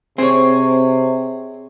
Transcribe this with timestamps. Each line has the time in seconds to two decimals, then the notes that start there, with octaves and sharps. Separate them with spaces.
0.18 C3 C4 G#4 C#5